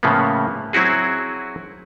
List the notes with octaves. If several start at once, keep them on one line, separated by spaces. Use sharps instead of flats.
A2 C#3 F3 A#3 B3
F#3 C4 E4 F#4 G#4